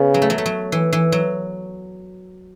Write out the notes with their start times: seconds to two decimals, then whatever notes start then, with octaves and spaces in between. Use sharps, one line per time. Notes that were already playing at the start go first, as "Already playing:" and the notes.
Already playing: C#3 B3
0.14 F#3
0.22 A3
0.30 F#3
0.38 A3
0.46 F#3
0.72 E3
0.93 E3
1.12 F#3